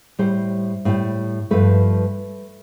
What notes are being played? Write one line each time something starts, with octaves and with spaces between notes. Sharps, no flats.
A2 G3 C5
A2 G3
G2 F3 A3 B4